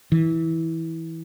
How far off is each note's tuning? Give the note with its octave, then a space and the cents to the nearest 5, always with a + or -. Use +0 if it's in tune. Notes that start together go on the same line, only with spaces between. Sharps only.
E3 -15